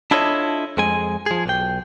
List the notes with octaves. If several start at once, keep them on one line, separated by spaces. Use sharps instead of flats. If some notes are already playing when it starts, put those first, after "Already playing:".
D4 E4 F4 A4 C#5 D#5
F2 G#3 G#5
F3 G#4
B1 G5